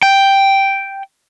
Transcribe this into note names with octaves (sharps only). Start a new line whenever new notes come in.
G5